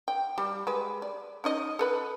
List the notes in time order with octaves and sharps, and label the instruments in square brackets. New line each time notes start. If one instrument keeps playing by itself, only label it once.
[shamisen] G5
G3
G#3 B4
D5
C#4 D#4 D#5
A4 B4 B5